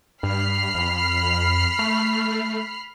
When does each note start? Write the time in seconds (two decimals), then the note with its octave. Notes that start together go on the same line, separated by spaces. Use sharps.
0.23 G2 B5 F6 C7
0.75 F2
1.79 A3